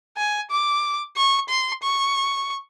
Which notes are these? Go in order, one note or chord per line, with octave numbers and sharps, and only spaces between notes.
G#5
D6
C#6
C6
C#6